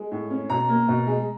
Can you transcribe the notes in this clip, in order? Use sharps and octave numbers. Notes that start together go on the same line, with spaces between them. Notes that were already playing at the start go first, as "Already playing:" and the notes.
Already playing: G#3
A2
C#4
B2 A#5
A#3
B2
G#3